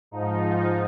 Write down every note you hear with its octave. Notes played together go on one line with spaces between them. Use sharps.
G#2 F3 D#4